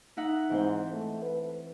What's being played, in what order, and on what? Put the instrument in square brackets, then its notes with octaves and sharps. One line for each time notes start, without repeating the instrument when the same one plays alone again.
[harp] D#4 E5 F#5
[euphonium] G#2 [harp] E3 C4 C5
[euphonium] A3
B4